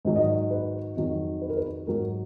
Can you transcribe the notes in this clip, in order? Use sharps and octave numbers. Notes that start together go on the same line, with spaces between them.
G#2 D#3 F#3
D#5
D#5
B4
F2 D#3 F#3
B4
A#4
B4
G#2 F#3 A#4